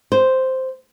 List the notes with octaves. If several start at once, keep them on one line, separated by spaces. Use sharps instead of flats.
C5